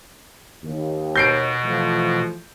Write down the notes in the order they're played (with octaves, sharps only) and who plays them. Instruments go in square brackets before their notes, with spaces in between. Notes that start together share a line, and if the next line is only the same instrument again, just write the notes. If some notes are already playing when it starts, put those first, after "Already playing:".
[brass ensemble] D#2
[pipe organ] B2 [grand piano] G6 C7 D7
[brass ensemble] E3 F3 A3